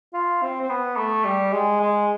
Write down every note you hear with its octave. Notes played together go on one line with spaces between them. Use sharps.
F4
C4
C4
B3
A3
G3
G#3
G#3